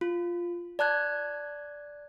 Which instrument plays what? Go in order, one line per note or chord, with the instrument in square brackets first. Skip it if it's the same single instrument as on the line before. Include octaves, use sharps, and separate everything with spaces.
[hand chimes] F4
D5 A5 F#6 G#6